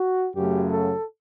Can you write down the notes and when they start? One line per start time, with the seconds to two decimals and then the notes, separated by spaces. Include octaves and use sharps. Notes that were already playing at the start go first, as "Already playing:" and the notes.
Already playing: F#4
0.35 F#2 C#3 F#3 A3 G4
0.72 A4